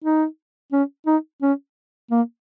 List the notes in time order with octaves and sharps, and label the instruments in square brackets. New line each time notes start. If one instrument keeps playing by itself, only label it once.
[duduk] D#4
C#4
D#4
C#4
A#3